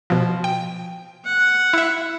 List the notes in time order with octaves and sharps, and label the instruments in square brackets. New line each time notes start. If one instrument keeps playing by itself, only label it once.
[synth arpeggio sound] B2 F3
G5
[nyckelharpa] F#5
[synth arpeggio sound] E4 E5